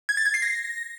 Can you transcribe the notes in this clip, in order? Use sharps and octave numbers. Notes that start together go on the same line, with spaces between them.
G#6
A6
G#6
C7
A#6